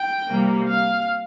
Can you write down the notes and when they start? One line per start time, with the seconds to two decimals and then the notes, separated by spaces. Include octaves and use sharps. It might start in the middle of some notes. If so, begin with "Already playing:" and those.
Already playing: G5
0.30 C3 G3 A#3
0.69 F5